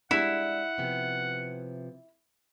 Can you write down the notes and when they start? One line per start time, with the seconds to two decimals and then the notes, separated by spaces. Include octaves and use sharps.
0.11 G3 G#3 D4 E4 F#5
0.78 C3 F3 B3